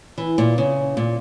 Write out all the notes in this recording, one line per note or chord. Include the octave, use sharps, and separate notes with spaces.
E3
A#2
C#3
A#2